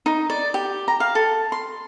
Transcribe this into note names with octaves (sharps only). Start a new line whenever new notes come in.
D#4
D5
G4
A#5
F5
A4
C6